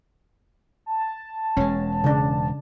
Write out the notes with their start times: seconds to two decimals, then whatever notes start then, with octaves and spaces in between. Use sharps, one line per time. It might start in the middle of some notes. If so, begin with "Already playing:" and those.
0.86 A5
1.57 E1 G#3 C#4
2.04 C#3 D4